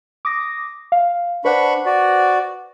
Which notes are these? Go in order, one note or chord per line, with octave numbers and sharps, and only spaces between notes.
D6 D#6 A#6
F5
D4 B4 C5 F#5 B5 C#6
F#4 D5